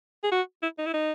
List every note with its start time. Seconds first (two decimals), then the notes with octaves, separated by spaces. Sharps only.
0.24 G#4
0.32 F#4
0.62 E4
0.78 D#4
0.86 E4
0.94 D#4